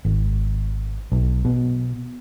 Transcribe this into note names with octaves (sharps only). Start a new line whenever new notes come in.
G#1
B1
B2